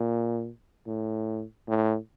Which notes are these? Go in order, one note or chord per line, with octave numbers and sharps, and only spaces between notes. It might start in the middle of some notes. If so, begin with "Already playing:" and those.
Already playing: A#2
A2
A2